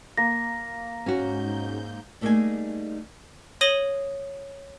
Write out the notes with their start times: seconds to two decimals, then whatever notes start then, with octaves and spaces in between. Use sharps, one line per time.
0.17 A#3 A#6
1.06 G#2 C#4 F#4 G6
2.21 G3 A3 A#3 D#4 G#4 G#5
3.61 C#5 D#6 A#6 D#7 F#7 G7